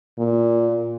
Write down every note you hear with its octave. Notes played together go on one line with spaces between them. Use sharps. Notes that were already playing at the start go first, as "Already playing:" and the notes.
A#2